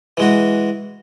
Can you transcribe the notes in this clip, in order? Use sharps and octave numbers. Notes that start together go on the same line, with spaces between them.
E3 G#3 F#4